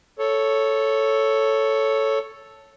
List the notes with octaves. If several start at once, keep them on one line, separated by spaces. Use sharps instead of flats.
A4 C#5